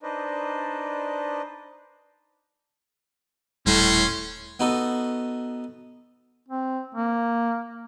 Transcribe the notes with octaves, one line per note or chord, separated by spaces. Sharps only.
D4 D#4 B4 C5 D5 D#5
D#1 A2 G3 C#4 C6
B3 D#4 F#4 A4
C4
A#3